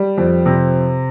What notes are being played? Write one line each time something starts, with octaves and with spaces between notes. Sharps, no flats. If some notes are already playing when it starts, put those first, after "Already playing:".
Already playing: G3
F2
C3